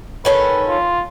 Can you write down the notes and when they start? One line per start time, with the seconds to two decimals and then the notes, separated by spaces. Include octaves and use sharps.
0.25 D#3 C#4 A4 B4
0.68 F4